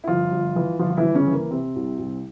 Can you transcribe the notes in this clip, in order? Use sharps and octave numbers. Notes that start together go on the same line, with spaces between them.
E4
G1 F3 F4
G1
E3
G1 F3 F4
F4
E3 E4
G1
C#3 C#4
E3
A#3
C3 C4
C2
C2